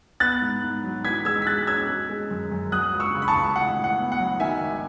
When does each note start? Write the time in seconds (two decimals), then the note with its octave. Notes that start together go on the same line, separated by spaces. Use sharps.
0.20 B3 F#6 A6
0.41 G#2
0.63 G#2
0.84 F#3
1.04 E3 G#6 B6
1.25 G#3 E6 G#6
1.42 B6
1.46 G#3 F#6 A6
1.67 C#4 E6 G#6
1.88 G#3
2.10 G#3
2.31 F#2
2.51 F#2
2.72 F#3 D#6 F#6
2.93 C#2
3.00 C#6 E6
3.14 C#3
3.22 B5
3.28 A5 C#6
3.36 C#2
3.56 A1 F#5
3.77 A2
3.84 F#5
3.98 B3
4.12 F#5
4.19 F#3
4.40 D#3 E5 G#5
4.61 G#1